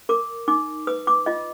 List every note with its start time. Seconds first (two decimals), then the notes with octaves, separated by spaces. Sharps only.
0.09 A#4 D6
0.48 D#4 D6
0.87 B4 D#6
1.07 D6
1.26 F4 D#5